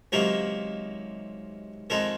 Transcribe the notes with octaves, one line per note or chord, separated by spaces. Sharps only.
C#2 C3 D#3 F#3 A#3 A#4
F2 D#3 G#3 A#4